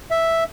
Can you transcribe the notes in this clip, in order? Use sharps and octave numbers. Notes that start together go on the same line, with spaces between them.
E5